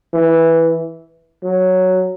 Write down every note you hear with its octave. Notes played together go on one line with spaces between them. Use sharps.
E3
F#3